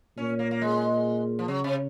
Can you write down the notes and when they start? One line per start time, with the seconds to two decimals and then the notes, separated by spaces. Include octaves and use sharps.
0.17 A#2 C#4
0.39 A#3
0.51 A#3
0.61 G#3
1.39 F3
1.48 C#3 F#3
1.64 C3